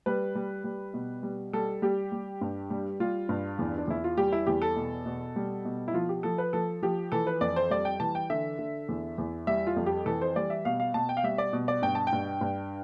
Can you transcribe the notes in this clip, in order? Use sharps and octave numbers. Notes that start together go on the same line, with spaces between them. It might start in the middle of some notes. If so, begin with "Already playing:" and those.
G3 B4
G3
G3
B2
G3
G3 A4
G3 G4
G3
G2
G3
G3 F4
G2
E2
D4
E2 E4
F4
G3 G4
E4
E2 G4
A4
B2
B2
G3
B2
E4
F3 F4
G4
F3 A4
B4
F3 A4
F3 G4
E3 A4
B4
F2 D5
C5
G3 D5
G5
E3 A5
G5
D3 E5
D3
E2
E2
G3 E5
F4
F2
G4
E3 A4
C5
G3 D5
E5
B2 F5
F5
B2 A5
G5
F5
G3 E5
D5
B2
D5
G2 G5
A5
G5
G2
G2